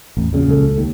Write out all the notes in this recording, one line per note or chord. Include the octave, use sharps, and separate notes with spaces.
A1 E2
A#1 C#3 F#3
C#2 A4
D#2